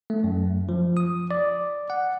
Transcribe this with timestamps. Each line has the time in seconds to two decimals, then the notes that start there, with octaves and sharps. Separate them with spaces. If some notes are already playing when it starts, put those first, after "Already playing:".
0.10 A3
0.24 F#2
0.69 F3
0.97 D#6
1.31 D5
1.90 F#5